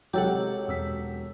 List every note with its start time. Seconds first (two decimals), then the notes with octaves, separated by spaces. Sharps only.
0.14 C3 F#3 G#3 G4 A4 F#5
0.68 E1 E6 B6